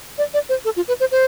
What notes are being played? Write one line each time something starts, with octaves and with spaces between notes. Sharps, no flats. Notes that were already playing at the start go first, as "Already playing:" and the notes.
D5
D5
C5
A4
F4
B4
C5
C5